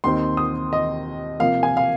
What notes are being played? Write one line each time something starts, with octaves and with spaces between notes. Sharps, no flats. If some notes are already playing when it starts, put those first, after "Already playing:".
D#2 D#3 C4 D#4 C6
D#6
D#5
C3 F3 A#3 F5
G#5
F5